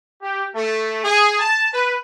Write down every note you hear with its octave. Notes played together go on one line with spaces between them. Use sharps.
G4
A3
G#4
A5
B4